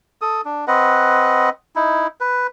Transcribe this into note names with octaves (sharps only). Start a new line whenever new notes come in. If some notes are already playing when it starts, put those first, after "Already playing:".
A4 D#6
D4
C4 B4 D#5 F#5
D#4 E4
B4